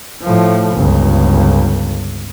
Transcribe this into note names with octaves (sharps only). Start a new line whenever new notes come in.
A2 F3
G1 C#2